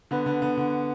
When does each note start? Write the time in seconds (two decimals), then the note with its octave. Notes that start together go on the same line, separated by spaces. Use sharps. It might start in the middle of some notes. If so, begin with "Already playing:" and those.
0.11 D3 B3
0.26 D3 B3
0.42 D3 B3
0.58 D3